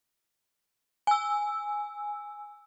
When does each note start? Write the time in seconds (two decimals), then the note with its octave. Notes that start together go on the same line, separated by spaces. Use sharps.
1.07 G#5 E6